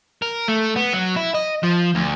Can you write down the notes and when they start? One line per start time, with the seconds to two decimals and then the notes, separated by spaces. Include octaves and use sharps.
0.22 A#4
0.48 A3
0.76 B3
0.93 F#3
1.16 E4
1.35 D#5
1.63 F3
1.95 D2